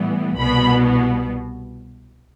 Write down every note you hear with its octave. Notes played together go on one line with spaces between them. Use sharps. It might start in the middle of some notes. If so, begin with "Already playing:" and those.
Already playing: A2 E3 G3 B3
C2 B2 G3 B3 B5